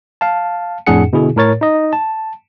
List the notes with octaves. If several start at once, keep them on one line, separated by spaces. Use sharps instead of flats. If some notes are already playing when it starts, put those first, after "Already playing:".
F5 A5
F2 A2 D4 G#4 F#5 C#7
B2 D3 E4 G#4
A2 A#4 C#5 A6
D#4 D#5
A5